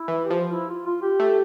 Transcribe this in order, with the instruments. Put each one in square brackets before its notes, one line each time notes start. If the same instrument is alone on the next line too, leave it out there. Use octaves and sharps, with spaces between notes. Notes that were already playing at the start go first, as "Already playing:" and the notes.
Already playing: [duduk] E4
[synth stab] E3
[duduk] G4
[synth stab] F3
[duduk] F4
E4
F4
F4
G4
[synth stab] A3